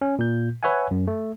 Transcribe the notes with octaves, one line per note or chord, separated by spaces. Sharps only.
C#4
A#2 G6
B4 C#5 E5 F#5 G#5
F#2
A3